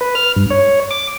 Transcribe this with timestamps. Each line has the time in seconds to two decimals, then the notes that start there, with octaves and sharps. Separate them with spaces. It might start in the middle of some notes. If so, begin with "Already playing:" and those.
0.01 B4
0.15 F6
0.36 G2
0.50 C#5
0.91 D6